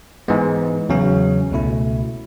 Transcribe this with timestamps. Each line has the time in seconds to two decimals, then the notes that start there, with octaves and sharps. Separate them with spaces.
0.28 G#2 E3 G#3 B3
0.89 E2 C#3 F#3 C#4
1.51 C#2 B2 A3 E4